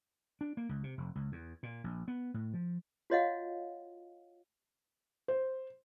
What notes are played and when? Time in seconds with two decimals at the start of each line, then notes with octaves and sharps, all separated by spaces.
0.41 D4
0.57 A#3
0.69 C#2
0.84 C3
0.97 F1
1.15 C#2
1.32 E2
1.63 A#2
1.84 A#1
2.08 B3
2.34 A2
2.53 F3
3.10 F4 F#4 C#5 D#5 F5 F#5
5.28 C5